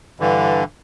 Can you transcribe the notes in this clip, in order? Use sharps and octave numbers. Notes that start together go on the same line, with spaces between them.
G2 D3 E3